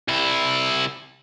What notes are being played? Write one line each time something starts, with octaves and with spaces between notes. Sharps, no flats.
C2 E4